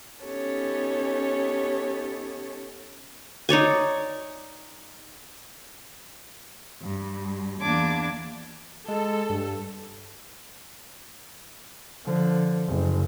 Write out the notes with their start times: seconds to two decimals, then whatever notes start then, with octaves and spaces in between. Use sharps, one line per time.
0.24 B3 C#4 D#4 G4 A4 C#5
3.49 D#4 C#5 D5 G#5
6.81 G2
7.61 E2 A#3 D4 A5 D6 G#6
8.88 G#3 A4
9.29 G2
12.05 D3 F3
12.68 F#1